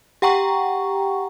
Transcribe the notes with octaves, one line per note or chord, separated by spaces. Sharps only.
G4 F#5 G5 A#5 C#6